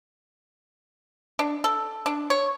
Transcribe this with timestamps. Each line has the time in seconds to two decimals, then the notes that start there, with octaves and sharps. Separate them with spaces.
1.39 D4
1.64 A4
2.06 D4
2.30 C#5